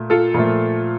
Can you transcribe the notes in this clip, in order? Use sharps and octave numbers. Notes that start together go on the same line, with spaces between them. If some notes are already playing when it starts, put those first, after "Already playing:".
Already playing: A#2 A3
F4 A4
A#2 F3 A3